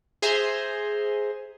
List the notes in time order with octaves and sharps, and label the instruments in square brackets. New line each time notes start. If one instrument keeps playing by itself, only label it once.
[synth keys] G#4 C5 E5 G#5 A#5 C6